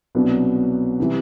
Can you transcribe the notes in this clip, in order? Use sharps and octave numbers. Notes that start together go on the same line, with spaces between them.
C2 B2 F#3 B3 D4
C3 E3 G3